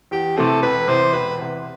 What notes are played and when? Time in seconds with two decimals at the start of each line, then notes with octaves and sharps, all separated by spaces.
0.11 E2 G4
0.37 C3 E3 A3 C4 A4
0.62 E1 B4
0.88 E2 C3 C5
1.13 E1 B4
1.38 E2 C3